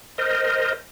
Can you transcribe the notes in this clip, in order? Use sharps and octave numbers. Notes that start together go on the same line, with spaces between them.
A#4 C5 D#5